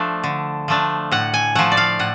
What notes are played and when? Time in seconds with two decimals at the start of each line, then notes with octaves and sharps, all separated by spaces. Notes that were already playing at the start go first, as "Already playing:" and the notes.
Already playing: F3 A3 D4
0.24 D3
0.68 F3 A3 D4
1.11 A2 F#5
1.34 G#5
1.55 F3 A3 F#5
1.72 D5
1.77 F5
1.99 A2 F#5